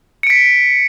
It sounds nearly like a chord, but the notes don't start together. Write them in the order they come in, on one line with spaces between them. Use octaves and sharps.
C#7 D7 B6